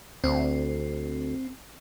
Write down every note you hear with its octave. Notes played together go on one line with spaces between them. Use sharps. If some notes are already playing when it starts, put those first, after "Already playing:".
D2 C4